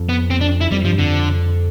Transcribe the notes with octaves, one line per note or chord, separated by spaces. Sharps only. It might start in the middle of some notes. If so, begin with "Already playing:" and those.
Already playing: F2
B3
C4
D4
E4
F2 G3
G2 F3
F2 D3